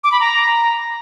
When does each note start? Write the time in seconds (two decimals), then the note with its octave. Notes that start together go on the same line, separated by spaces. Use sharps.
0.04 D6
0.12 B5
0.20 A#5